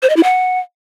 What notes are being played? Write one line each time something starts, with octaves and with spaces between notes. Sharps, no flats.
C5
D#5
E4
F#5